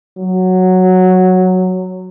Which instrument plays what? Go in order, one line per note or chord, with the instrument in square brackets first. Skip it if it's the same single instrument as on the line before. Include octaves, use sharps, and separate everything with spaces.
[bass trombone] F#3